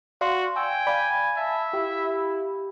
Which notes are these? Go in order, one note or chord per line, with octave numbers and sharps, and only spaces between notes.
F#4 D5 F5 C6
G5 G#5 E6
D5 F5 B5
E5 A5
E4 G4